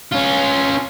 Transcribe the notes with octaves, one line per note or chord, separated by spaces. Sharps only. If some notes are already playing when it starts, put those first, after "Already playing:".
C#4 F4